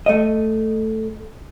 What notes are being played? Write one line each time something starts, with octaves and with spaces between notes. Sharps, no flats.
A3 D#5